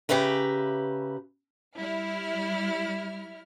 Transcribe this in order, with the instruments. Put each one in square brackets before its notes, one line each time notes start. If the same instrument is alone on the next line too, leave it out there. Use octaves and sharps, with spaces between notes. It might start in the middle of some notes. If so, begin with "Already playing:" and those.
[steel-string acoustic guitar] C#3 G4 B4 E5 A#5
[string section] G3 E4 F6